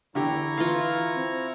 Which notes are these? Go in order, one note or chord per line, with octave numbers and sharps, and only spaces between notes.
E2 D3 E4 G4 A#5 C#6
E3 F4 F5
C4